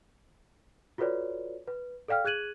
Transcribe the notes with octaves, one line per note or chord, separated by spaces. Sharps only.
F4 F#4 A4 B4 C#5 D5
B4
A4 D5 F5 G5 F6
G#4 F#6 G#6 D#7 F#7